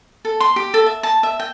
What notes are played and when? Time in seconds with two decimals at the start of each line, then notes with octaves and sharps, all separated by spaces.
0.25 A4
0.40 C6
0.56 G4
0.74 A4
0.86 E5
1.03 A5
1.23 E5
1.40 G5